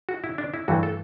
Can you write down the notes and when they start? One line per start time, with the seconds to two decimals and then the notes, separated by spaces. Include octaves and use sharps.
0.09 F#4
0.24 E4
0.38 D4
0.54 E4
0.68 G2 E3 A3 F#4
0.83 A4